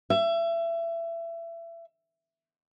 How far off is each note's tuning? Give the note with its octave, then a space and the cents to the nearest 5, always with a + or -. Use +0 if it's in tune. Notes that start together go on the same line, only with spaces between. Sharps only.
E5 +25